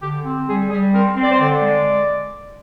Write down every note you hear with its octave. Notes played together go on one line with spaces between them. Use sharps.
D3 G4
C4
G3 G#4
G3 G#4
C4 A#4
C4
D5
C5
D3 D5
D5
G#3